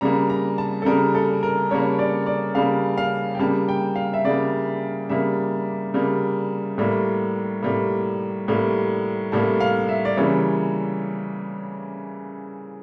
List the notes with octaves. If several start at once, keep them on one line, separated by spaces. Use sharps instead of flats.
C#3 G3 A#3 A#5
A#5
A5
A4
C#3 G3 A#3 A#4
A4
A#4
C#3 G3 A#3 C#5
D5
D5
C#3 G3 A#3 F5
F5
G5
C#3 G3 A#3 A5
G5
F5
E5
C#3 G3 A#3 D5
C#3 G3 A#3 E5
C#3 G3 A#3
A2 G3 A#3
A2 G3 A#3
A2 G3 A#3
A2 G3 A#3 A5
F5
E5
D5
C#3 E3 G3 A#3 C#5